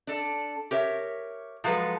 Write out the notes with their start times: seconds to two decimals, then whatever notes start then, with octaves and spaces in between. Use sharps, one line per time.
0.07 D4 A4 D5
0.71 G4 A#4 C#5 E5
1.64 F3 F#3 G#3 A4 B4